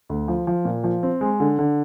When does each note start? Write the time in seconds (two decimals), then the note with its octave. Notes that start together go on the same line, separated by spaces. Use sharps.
0.09 D2
0.28 F3
0.47 F3
0.65 A#2
0.84 F3
1.03 C4
1.21 G#3
1.40 D3
1.59 D3